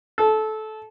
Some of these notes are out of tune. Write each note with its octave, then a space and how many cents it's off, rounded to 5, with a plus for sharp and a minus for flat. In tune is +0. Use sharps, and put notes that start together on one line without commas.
A4 -20